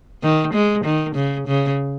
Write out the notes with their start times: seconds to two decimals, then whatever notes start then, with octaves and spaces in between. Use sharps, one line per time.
0.23 D#3
0.54 G#3
0.85 D#3
1.15 C#3
1.47 C#3